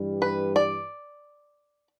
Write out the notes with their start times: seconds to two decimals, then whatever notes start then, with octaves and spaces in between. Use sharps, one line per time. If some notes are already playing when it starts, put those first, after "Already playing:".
Already playing: G2 E3 G3
0.22 B4
0.56 D5